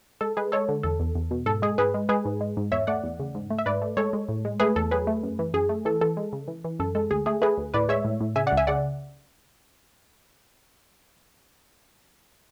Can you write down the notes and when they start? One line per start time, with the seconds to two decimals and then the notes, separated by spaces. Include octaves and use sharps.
0.21 G#3 A4
0.37 G#3 G#4 B4
0.52 G#3 A4 C#5
0.69 D3
0.83 E2 A4
1.00 E2
1.15 E2
1.31 B2
1.46 G#2 A4
1.62 G#3 G#4
1.78 G#2 G#4 B4
1.94 G#3
2.09 G#3 G#4 B4
2.25 G#2
2.41 G#3
2.57 G#2
2.72 E2 C#5 E5
2.87 A3 D5 F#5
3.04 E2
3.20 C#3
3.35 G#2
3.51 A3
3.58 E5
3.66 G#2 B4 D5
3.82 A3
3.97 G#3 A4 C#5
4.13 G#3
4.29 A2
4.45 G#3
4.60 A3 G#4 B4
4.76 E2 A4
4.91 F#3 G#4 B4
5.07 A3
5.23 F#2
5.39 E3
5.54 F#2 G#4
5.69 A3
5.85 E3 A4
6.01 E3 A4
6.17 G#3
6.33 C#3
6.48 E3
6.64 E3
6.80 F#2 A4
6.95 G#3 A4
7.10 D2 G#4
7.26 A3 G#4
7.42 A3 G#4 B4
7.58 D2
7.74 A2 B4 D5
7.89 G#3 C#5 E5
8.05 A2
8.20 A2
8.36 C#3 E5 G#5
8.47 D5 F#5
8.52 C#2
8.57 E5 G#5
8.67 C#3 D5 F#5